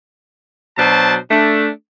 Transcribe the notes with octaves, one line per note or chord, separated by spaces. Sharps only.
B2 F#3 D4 C5 A5
A3 D4